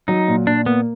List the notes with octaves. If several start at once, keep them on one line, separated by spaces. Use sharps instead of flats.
F#3 D#4
A#2
A#2 D4
A#3 B3